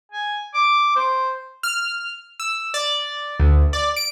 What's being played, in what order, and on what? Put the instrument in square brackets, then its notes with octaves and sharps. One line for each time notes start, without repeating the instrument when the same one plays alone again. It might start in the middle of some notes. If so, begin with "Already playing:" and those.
[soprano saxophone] G#5
D6
C5
[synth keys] F6
E6
D5
D2
D5
D7